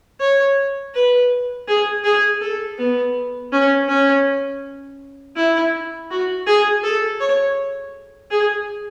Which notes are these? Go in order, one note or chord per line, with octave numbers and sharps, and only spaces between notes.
C#5
B4
G#4
G#4
A4
B3
C#4
C#4
E4
F#4
G#4
A4
C#5
G#4